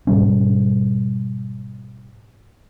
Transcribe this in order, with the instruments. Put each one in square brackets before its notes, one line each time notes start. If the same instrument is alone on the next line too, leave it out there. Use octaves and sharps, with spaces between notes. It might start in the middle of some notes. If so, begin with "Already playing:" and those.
[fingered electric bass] G#2 B2 G3 C#4